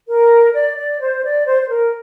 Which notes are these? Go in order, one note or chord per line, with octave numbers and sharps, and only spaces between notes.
A#4
D5
D5
C5
D5
C5
C5
A#4